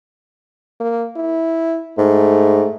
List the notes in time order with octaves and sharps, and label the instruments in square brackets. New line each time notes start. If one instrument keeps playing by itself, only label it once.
[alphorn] A#3
E4
[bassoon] G#2 [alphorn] A3